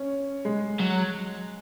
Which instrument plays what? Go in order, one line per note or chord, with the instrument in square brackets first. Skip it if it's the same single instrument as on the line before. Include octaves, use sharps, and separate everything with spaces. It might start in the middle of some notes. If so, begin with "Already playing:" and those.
Already playing: [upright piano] C#4
G#3
[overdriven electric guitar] F#3